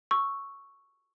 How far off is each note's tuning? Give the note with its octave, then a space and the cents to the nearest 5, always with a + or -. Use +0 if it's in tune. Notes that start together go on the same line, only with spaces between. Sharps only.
C#6 +0 E6 +0